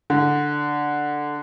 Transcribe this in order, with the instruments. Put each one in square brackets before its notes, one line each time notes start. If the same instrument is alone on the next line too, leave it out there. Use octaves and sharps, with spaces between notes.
[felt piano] D3